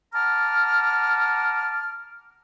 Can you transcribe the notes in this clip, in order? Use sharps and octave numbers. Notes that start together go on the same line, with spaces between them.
F#5 A5 A#5 D6 F6